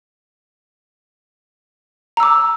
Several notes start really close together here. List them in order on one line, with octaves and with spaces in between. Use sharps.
A#5 E6 D6